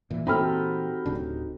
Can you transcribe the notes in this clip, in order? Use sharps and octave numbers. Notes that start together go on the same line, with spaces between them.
A#2 E3
C4 D#4 F#4 G4 A4 G5 B5 F6
D1 C#3 D4